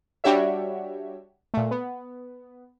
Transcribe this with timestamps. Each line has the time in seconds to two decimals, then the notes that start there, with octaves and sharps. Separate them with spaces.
0.24 G3 D4 F#4 G4 C#5 E5
1.54 A#2 A3
1.71 B3